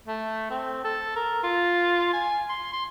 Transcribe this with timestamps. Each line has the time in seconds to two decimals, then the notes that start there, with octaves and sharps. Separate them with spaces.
0.08 A3
0.50 C4
0.84 A4
1.16 A#4
1.43 F4
2.13 G#5
2.49 C6
2.73 C6